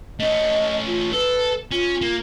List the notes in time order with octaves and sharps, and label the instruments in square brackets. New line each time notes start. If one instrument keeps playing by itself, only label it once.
[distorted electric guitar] A3 C#4 [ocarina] D#5
[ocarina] F4
[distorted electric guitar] A4 [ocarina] B4
[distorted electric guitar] C#4 [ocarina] F4
[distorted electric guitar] A#3